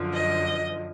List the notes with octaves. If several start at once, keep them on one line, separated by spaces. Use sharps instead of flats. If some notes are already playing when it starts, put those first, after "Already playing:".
Already playing: F#2 D3 F3
D#5